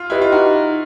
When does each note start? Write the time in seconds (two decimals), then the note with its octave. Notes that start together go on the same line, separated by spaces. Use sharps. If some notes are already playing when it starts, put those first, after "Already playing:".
Already playing: F4
0.10 E4 G4 B4 D#5
0.21 F4
0.32 D#4 F#4